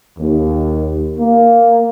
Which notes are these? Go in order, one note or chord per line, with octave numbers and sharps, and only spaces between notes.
D#2
A#3